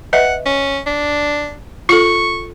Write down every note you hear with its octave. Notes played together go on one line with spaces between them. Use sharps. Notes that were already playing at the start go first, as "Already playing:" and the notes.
B4 D#5 E5 F#5
C#4
D4
F4 A4 C#6